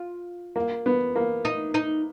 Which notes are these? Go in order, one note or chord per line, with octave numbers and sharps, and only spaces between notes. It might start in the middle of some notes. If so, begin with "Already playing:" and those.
Already playing: F4
A#3
B3
A#3
D#4
D#4